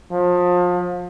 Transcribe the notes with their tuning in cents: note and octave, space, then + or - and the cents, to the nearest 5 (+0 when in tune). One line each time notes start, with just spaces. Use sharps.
F3 +30